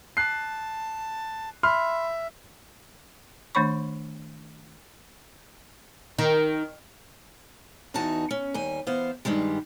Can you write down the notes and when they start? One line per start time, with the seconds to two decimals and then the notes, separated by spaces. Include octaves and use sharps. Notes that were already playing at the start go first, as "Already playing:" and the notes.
0.17 A5 F#6 C7
1.63 E5 B5 C6 F6
3.55 D#3 A3 D4 C#5 B5 C#6
6.18 D#3
7.94 E2 E3 D#4 F#4 A5
8.31 C#4
8.54 D#2 G3 G#5
8.87 E3 B3 C5 F5
9.25 G2 D#3 G3 G#3